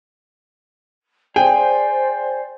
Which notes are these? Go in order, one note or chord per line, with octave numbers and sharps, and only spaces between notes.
G#4 C5 D5 G5